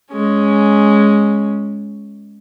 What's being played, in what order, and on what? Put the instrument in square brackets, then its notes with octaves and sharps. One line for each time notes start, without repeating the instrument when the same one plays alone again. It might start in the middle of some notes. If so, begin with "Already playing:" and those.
[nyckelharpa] G#3 C#4